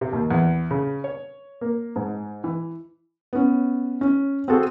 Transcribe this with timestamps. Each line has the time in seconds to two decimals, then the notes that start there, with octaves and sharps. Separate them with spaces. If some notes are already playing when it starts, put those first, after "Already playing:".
0.01 C3
0.13 D#2
0.31 E2
0.71 C#3
1.04 C#5
1.61 A#3
1.96 G#2
2.44 E3
3.33 B3 C#4
4.01 C#4
4.48 C4 F#4 G#4 A4